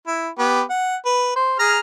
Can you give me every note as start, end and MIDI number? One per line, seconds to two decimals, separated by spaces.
0.07 0.29 64
0.39 0.62 59
0.39 0.62 67
0.70 0.96 78
1.06 1.31 71
1.36 1.57 72
1.59 1.79 68
1.59 1.79 82
1.59 1.79 89